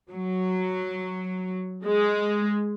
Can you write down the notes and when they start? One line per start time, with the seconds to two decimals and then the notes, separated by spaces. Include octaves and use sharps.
0.11 F#3
1.85 G#3